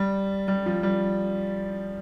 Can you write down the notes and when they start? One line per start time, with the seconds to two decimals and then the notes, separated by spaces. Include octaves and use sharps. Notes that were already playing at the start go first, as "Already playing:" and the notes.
Already playing: G3
0.48 G3
0.66 F3
0.83 G3